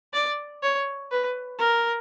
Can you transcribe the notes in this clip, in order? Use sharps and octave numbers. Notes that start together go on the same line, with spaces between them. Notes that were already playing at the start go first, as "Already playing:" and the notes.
D5
C#5
B4
A#4